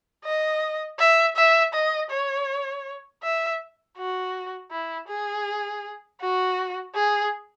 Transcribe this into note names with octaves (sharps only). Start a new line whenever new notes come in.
D#5
E5
E5
D#5
C#5
E5
F#4
E4
G#4
F#4
G#4